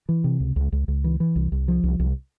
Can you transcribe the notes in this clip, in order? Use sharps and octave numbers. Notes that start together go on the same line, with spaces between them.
E3
C3
C#2
C#2
C#2
C#2
E3
E3
C2
C2
F3
C2
C2